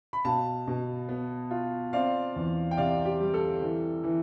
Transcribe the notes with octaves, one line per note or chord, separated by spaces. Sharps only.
B5
B2 F5 A5
B2
B3
F4
C4 D5 F5
E2
G5
C3 D5 F5
G4
G3
A4
E3
E3